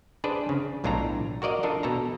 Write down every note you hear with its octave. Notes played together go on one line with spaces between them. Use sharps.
D4 G#4 B4 C5 D5
C#3
B1 A2 D4 F4 A4 A#5
F#4 A#4 D5 D#5 F5
D4 F4 A4 A#4 D#5
B2 A4 A#5